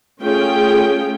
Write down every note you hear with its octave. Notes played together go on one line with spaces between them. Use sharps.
A3 C#4 F4 G#4 G5